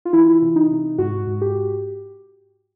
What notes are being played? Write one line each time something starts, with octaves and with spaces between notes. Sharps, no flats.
F4
E3 E4
C3
D#4
C3
G#2 F#4
G#2
G4